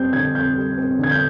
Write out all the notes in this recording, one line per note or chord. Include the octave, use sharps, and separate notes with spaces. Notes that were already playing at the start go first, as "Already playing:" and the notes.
Already playing: F2 G3 C4 G6
D3 G#6
F2 G6
G3
C4
D3 G#6
G6